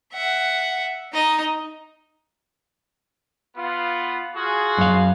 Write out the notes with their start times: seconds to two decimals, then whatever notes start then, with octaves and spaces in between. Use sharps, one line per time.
0.13 E5 F#5
1.13 D#4 D#5
3.57 B3 F4
4.35 F4 F#4 G#4
4.78 F#2 F5